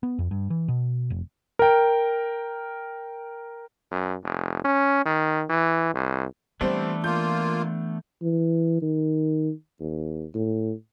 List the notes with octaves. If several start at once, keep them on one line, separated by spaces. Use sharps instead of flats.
B3
F2
G2
E3
B2
F1
A#4 G5
F#2
F1
C#4
D#3
E3
C2
E3 G3 A3 B3 C4 D4 C5
A#3 F4 G6
E3
D#3
D#2
A2